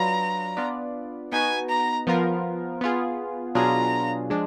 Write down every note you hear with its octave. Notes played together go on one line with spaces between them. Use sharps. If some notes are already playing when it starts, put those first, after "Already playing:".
Already playing: F#3 D4 F4 B4 A#5
B3 D4 F4 B4 D5
B3 D#4 F#4 B4 G#5
A#5
F3 B3 F4 A#4
B3 F4 G#4
B2 F#3 D4 F4 G#4 A#5
F3 G#3 D4